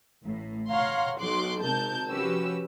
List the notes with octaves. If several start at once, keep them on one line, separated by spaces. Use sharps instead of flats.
A1 A2
C#5 F5 F#5 A#5 C6
B1 F#3 C6 D6 F#6
G#1 C3 C4 A#4 A5 G6
F3 C#4 F#4 G4 B4 E6